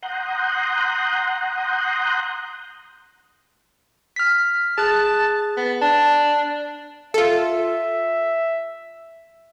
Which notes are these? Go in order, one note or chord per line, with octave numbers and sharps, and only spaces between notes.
F#5 A#5 C6 D#6 F#6 G6
F6 B6
G#4 A5 F#6
B3
D4 A5
F4 A4 E5